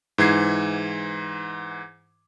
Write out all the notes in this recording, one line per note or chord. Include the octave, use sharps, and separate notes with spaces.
G#2 E3 G#6 C7